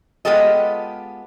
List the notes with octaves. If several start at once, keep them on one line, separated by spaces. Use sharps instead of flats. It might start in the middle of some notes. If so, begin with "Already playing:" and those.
G#3 B3 F4 G4 A4 D#5